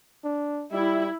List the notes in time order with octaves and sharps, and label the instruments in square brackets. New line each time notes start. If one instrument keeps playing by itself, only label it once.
[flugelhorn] D4
[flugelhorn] G3 [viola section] E4